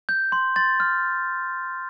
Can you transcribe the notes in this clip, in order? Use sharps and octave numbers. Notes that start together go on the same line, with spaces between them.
G6
C6
C6 A6
F6